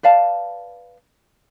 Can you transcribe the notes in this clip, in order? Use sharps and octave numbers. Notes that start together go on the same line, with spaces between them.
B4 D5 F5 A5